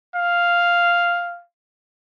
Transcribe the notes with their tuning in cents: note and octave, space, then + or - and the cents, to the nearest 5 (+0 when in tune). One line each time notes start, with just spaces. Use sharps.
F5 +0